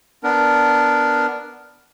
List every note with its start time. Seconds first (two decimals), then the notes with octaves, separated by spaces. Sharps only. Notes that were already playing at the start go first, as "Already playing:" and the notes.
0.23 B3 D4 A#4